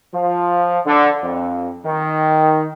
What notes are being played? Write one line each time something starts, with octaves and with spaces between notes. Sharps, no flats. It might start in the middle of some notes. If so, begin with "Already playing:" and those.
F3
D3
F2
D#3